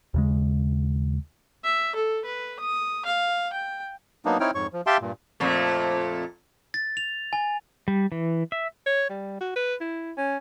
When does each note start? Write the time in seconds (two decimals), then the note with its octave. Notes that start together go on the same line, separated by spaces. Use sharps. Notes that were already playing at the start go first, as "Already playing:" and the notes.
0.14 D#2 C#3 G#3
1.64 E5
1.95 A4
2.25 B4
2.59 D#6
3.05 F5
3.53 G5
4.25 F#3 A#3 B3 D4 D#4
4.40 C4 D#4 E4 C#5 G5 F6
4.55 F2 G#2 C#5 C#6
4.73 F3
4.87 G4 E5 F5 G5 A5 C6
5.01 G2 A#2
5.40 F2 A#2 A3
6.74 A6
6.97 F7
7.33 G#5
7.88 G3
8.12 E3
8.52 E5
8.86 C#5
9.09 G3
9.41 F#4
9.56 B4
9.81 E4
10.17 C#4